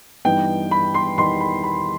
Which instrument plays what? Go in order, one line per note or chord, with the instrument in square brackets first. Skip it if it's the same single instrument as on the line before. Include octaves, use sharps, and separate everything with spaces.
[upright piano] G2 E3 B3 D#4 [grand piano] G5
[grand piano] B5
C6
[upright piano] E2 D#3 G3 D#4 [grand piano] C6
[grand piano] B5
B5